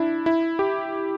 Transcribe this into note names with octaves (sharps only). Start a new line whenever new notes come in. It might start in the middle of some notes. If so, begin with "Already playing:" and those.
Already playing: D4 E4
E4
G4